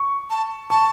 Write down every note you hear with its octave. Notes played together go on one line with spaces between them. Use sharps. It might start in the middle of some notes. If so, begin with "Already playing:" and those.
Already playing: C#6
A5
A5 C#6